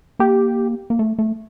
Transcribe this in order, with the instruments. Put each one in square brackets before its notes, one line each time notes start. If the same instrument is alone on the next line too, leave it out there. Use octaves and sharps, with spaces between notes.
[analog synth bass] A#3 [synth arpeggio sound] G4
[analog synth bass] A#3
A3
A3